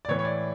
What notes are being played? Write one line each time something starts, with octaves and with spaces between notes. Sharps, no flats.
D5
A2 E3 C#5
C#5
D5